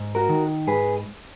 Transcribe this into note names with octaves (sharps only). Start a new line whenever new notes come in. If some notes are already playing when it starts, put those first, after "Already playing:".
Already playing: G#2
F#4 A#4
D#3
G#2 G#4 B4